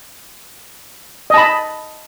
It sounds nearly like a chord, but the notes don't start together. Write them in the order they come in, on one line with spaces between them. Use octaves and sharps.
D#5 A5 B5